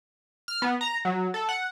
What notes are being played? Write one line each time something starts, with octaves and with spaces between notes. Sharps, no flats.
F6
B3
A#5
F#3
A4
F#5